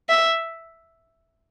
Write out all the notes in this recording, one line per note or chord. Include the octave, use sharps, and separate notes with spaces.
E5